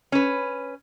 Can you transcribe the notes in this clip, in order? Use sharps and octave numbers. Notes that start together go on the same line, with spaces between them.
C#4 B4